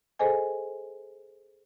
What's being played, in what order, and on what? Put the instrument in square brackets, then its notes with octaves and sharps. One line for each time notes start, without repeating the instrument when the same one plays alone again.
[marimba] G#4 A4 C5 D#5 G#5